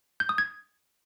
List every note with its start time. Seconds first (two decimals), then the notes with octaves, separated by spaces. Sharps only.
0.20 G6
0.29 D#6
0.38 G#6